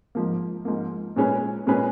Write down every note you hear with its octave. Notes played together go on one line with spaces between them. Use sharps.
G#2 F3 A#3
G#2 F3 A#3
A#2 G#3 C#4 G#4 B4
A#2 G#3 C#4 G#4 B4